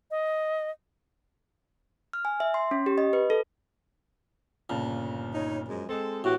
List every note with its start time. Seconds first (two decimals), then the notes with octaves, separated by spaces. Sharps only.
0.11 D#5
2.13 F6
2.25 G#5
2.40 E5
2.54 C6
2.71 C#4
2.86 G4
2.98 D#5
3.13 B4
3.30 A4
4.70 G1 A#2 C#3 A5
5.33 D#4 C#5
5.67 F#2 F3 G#3
5.89 G#3 C4 A4
6.24 A2 E3 F#4 G4